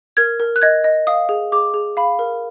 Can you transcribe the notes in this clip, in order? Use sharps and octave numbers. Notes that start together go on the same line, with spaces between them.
A#4 G#6
A#4
F#6
D#5 G#6
D#5
F5 D#6
G#4
G#4 D6
G#4
F5 B5
A#4